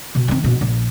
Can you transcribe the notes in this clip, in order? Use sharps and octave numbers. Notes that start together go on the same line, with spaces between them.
B2
D#3 C4
A#1 B2
A#1